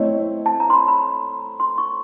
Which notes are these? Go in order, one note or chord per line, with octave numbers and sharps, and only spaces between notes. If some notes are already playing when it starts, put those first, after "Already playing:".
Already playing: A3 C4 E4 A4 C#5 D#5
A5
A#5
C6
B5
B5
C6
C#6